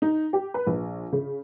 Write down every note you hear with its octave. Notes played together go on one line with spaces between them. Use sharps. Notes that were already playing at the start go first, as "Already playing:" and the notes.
D#4
G4
B4
A#1
C#3